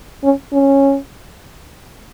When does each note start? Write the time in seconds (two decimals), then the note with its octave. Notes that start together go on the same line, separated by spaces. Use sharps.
0.24 C#4
0.53 C#4